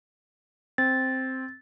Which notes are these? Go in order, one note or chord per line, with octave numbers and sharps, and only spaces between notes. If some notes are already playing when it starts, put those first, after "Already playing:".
C4 A6